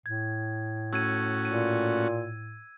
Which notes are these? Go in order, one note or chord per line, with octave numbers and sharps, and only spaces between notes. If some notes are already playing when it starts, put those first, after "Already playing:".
A2 G#6
A3 C#4 F#4 E6 G#6 D#7
A#2 D#7